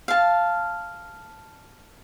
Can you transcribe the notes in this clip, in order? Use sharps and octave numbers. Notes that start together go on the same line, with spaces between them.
F5 A5